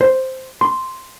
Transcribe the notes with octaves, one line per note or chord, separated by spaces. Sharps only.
C5
C6